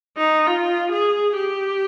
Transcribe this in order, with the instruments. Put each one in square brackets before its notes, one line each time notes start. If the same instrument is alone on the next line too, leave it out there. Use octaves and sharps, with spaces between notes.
[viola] D#4
F4
G#4
G4